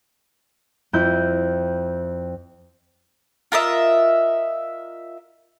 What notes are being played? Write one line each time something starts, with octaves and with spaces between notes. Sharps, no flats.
F2 E4 G6
F4 A#4 D#5 E5